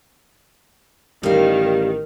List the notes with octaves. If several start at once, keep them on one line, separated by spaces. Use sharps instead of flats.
A1 D#3 G3 F5